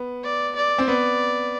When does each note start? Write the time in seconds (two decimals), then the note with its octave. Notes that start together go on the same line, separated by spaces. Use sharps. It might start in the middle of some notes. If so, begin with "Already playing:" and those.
Already playing: B3
0.23 D5
0.56 D5
0.78 C4
0.88 B3 D5